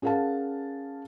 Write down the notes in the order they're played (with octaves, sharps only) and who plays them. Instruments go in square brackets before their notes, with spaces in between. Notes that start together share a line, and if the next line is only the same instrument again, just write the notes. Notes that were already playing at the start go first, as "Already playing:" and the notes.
[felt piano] C#4 G#4 A#4 F5 F#5 A5